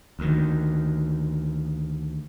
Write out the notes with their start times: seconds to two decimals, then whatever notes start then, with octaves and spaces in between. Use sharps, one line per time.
0.19 D2 D#3